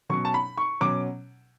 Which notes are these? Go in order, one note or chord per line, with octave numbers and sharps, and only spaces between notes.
B2 F#3 C#4 C#6
A5
B5
C#6
B2 F#3 C#4 D6